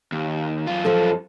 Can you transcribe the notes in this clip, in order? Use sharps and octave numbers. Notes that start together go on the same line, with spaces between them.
D#2
F#2 F4
F3 A4